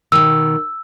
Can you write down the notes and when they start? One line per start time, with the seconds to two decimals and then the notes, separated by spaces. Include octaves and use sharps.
0.12 B2 D#3 E6